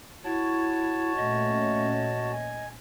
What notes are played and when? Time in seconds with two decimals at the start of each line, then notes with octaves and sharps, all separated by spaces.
0.24 E4 F#4 C#5 A5
1.16 A#2 A3 C#4 D#5
2.33 G#5